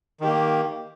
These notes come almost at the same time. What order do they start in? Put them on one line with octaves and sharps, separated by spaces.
D#3 G4 A#3